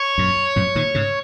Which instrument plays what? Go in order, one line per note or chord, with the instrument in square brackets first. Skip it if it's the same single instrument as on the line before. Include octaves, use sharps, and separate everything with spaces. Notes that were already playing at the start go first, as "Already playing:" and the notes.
Already playing: [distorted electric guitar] C#5
[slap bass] F#2 A#2
F#2 A#2
A#2 D#3
G#2 C#3